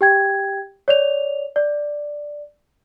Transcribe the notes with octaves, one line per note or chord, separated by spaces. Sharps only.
G4 G5 G#6
C#5 D5 F7
D5